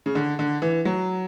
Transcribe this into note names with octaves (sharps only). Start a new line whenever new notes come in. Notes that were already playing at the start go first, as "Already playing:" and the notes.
C#3
D3
D3
E3
F#3